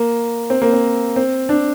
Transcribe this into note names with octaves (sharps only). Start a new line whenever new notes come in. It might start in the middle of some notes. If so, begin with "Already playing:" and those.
Already playing: A#3
C4
A#3
C4
C4
D4